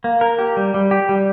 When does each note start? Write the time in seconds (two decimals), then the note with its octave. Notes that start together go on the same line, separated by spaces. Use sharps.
0.04 A#3
0.21 A#4
0.39 G4
0.57 G3
0.74 G3
0.91 G4
1.09 G3